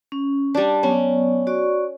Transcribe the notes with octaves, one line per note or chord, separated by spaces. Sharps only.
C#4
G3 D4
F#3 B3 C#4 D5
F#4 D5 C#6